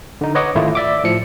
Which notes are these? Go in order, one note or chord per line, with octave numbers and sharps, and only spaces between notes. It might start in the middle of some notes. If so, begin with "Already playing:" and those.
D3 D#4
B4 C#5 D#5 F#5 D6
G#1 D#3 A3 E4 F4
D5 E5 D6
A2 F3 C#7